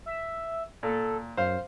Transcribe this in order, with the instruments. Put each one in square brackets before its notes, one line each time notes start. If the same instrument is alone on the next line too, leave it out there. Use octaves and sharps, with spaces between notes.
[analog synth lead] E5
[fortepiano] A#2 [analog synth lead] A4
[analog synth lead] F#2 [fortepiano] C5 F5